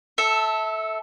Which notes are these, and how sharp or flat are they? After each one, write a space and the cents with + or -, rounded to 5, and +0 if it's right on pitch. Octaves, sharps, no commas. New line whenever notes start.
A4 +0 E5 -20